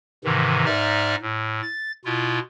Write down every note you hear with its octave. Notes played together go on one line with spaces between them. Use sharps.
G#2 C3 D#3 E3
G#2 D#4 D5 E5 F6
A2
A6
B2 E4 F4